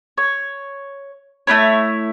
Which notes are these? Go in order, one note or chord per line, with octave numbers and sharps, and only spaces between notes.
C#5
A3 D4 E4 C#5